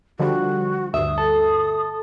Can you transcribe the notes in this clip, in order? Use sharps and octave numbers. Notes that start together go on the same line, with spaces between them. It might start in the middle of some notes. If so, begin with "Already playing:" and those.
D3 F3 G3 F#4
D2 G2 E5 D#6
A4